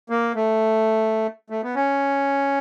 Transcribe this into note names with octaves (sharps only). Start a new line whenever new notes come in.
A#3
A3
A3
B3
C#4